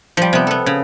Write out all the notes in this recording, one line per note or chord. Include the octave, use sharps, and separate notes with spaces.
F3 G3
C3 B3
B3 A4
C#3